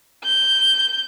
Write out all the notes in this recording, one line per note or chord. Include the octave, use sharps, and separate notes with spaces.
G6